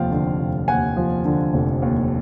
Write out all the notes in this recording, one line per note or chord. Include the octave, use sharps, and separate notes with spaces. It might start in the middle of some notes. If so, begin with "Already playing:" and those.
Already playing: F1 D#2 F3 F5 G5
D3
F1
D#2 F#5 G#5
F3
D3
F1
D#2